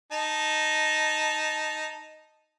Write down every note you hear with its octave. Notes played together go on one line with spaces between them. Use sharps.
D#4 A5